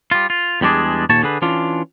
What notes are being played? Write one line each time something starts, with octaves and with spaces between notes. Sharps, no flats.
G3 F4
F4
E2 G3 G#3 D4 G#4
D#2 A#2 C#5 A5
D3 G#4 B4
E3 C#4 D4 F4